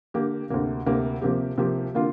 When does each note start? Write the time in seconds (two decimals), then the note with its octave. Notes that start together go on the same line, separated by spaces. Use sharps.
0.14 D3 A#3 G4
0.50 D2 C3 A#3
0.86 D2 C3 A#3
1.22 C3 F3 A#3 G4
1.58 C3 F3 A#3 G4
1.94 D3 A#3 F4